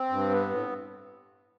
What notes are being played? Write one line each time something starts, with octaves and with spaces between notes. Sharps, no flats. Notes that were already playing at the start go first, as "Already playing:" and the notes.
Already playing: C4
G2
B3
A2